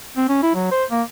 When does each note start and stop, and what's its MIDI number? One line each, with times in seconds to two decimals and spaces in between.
0.17 0.27 60
0.29 0.42 61
0.43 0.53 64
0.55 0.67 54
0.71 0.85 72
0.91 1.02 58